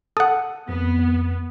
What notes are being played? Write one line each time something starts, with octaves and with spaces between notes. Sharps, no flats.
A4 F#5 D#6
F2 B3